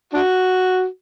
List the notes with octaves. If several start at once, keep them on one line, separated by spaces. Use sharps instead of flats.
D4 F#4